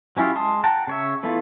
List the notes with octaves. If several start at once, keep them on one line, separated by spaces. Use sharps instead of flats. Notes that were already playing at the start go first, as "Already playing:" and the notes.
F#3 C#4 E4 F4 G4
G#3 A5 C6 D#6
F#5 G5 A5 A#5
C#3 C#5 E5
E3 A3 B3 E4 F4